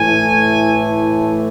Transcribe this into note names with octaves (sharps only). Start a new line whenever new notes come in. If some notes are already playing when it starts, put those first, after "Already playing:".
Already playing: A2 E3 A3 G#5